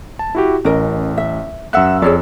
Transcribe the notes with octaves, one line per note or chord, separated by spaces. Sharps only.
A5
E4 F#4 G4
A1 C#4 A#4 D#5
E5
F#2 E5 F#5 E6 F#6
F2 G#4 C#5 D5